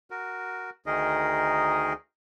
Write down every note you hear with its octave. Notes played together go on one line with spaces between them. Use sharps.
F#4 A#4
D2 D#3 D#4 G#4 A#4 D#5